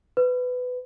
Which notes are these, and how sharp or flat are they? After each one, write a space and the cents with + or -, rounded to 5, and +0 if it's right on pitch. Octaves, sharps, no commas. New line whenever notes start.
B4 +15